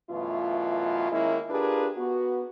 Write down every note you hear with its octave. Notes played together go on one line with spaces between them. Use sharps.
F#2 B2 E3 A3 F4
D#3 G#3 A#3 C#4 E4
D4 F4 G4 G#4 A#4 B4
B3 F#4